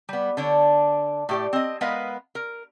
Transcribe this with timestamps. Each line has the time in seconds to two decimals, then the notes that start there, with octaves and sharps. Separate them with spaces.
0.09 G3 B3
0.37 D3 D4 C#5
1.29 A2 G4 D5
1.53 C4 D#5
1.81 G#3 B3 A#4 B4 D#5 F5
2.35 A#4